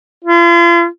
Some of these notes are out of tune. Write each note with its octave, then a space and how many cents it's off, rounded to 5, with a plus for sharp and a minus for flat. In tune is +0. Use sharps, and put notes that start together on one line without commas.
F4 -40